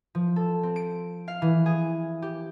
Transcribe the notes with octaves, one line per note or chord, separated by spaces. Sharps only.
F3
A4
C4
D7
F5
E3
G#4
G4